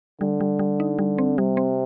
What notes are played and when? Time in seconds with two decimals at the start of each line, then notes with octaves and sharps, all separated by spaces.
0.21 D3 G3
0.41 G3
0.59 G3
0.80 D#4
0.99 G3
1.18 C4
1.38 C3 G3
1.57 C4